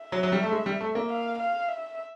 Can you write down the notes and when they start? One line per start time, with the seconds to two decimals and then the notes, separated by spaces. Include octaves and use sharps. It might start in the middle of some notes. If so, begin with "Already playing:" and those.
Already playing: E5
0.12 F#3
0.23 F#3
0.32 G3
0.43 A3
0.52 G#3
0.66 G3
0.81 A3
0.95 A#3
1.10 F5
1.39 F5
1.69 E5